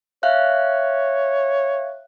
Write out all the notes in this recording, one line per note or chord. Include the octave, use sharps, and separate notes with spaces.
C#5 E5 F5 F#6